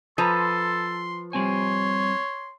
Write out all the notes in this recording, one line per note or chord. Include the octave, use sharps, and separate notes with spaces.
F3 A4 B4 A#5 C6
G3 C4 C#5 G#5 C6